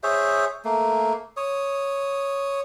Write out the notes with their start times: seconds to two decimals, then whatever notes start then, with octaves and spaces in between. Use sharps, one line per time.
0.03 G#4 C5 C#5 E5
0.65 A3 A#3
1.37 C#5 D#6